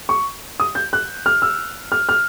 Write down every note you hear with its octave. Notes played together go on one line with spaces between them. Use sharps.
C#6
D#6
G6
F#6
F6
E6
F6
F6